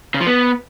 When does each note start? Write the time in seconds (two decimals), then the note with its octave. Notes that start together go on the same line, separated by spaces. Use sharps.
0.14 C#3
0.20 F3
0.27 B3